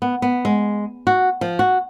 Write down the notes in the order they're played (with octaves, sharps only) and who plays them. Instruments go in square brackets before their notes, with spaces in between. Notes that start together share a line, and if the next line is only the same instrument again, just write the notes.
[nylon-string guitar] B3
B3
G#3
F#4
F3
F#4